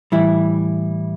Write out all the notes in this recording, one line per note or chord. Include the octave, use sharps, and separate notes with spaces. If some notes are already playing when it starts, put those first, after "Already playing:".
A2 E3 G3 E4